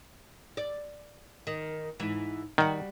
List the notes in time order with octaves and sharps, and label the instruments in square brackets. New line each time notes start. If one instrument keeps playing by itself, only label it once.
[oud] D5
D#3
G#2 E3
[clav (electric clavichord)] D#3 [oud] G3 F#4